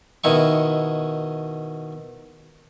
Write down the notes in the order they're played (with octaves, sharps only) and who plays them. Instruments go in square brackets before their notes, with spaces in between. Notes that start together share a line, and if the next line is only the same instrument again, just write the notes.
[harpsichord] B2 D#3 E4 C#6